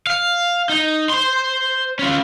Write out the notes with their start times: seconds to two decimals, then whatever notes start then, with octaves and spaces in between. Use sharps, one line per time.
0.07 F5
0.69 D#4
1.10 C5 C6
1.99 C#4 F4